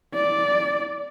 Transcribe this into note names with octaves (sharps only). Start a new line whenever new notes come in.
D5